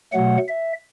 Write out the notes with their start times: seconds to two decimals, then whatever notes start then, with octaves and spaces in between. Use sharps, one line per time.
0.13 B2 F#3 A3 F#5
0.48 E5